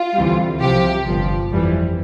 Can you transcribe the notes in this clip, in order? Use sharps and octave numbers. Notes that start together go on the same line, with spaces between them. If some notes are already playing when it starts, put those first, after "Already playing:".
Already playing: F4
D2 C3 E3 G3
C2 C3 F3 G4
G1 G2 F3
F2 E3 G3